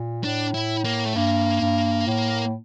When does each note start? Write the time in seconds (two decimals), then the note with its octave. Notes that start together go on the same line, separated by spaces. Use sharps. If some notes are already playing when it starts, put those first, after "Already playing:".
Already playing: A#2
0.24 A2 D4
0.54 E4
0.85 A#3
1.05 A3
1.16 G2 A#3
1.61 G2
2.07 A2